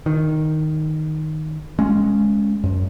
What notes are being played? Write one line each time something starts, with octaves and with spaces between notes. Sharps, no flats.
D#3
G#3 C#4
F#2